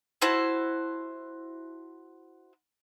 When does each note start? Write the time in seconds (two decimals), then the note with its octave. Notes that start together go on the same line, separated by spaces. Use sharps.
0.21 E4 F#4 C5 A5